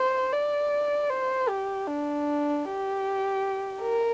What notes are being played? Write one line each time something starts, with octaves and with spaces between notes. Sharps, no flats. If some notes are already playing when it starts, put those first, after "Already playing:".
Already playing: C5
D5
C5
G4
D4
G4
A#4